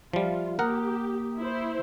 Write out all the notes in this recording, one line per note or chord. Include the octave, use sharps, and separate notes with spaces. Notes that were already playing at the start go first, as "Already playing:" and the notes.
F3 G3 F4 E5
A#3 G4 A#4 F#5 A#5 D#6
E4 C5